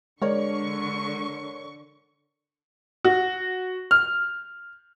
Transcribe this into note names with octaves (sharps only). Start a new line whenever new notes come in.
D3 G#3 A#4 C#5 D5 C#6
F#4
F6